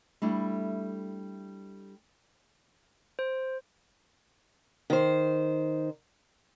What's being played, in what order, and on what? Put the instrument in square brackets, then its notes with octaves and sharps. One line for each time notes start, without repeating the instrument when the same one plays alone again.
[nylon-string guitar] G3 A3 D4 E4
[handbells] C5
[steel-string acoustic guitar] D#3 C5